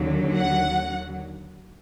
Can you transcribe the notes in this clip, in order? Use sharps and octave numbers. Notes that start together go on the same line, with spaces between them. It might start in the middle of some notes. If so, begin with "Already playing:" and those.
Already playing: D#2 D3 F#3
F#5